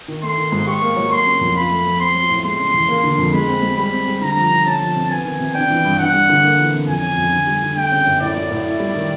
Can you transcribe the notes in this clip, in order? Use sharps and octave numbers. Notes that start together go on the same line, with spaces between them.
D#3
A3 C6
D#3
G#2
G4 C#6
A#3
F#3
A#3 C6
C#3
F2
F4 B5
A3
F3
C4 C6
F#3
A2
G#3 C6
C#3
E2
A#3
D3
F2
G#3 B5
C4
G#3
G3 B5
C4
G3
D3 A#5
F3
D3
C#4 A5
F3
C3
B3 G#5
D#3
C3
D4 G5
E3
G2
D4 F#5
G3
D3
A#3
E3
C3
F2 G#5
C#3
F2
D3
G3
D3
A3 G5
C#3
F#2
A2 D5
F#3
A2
E4
G3
D#3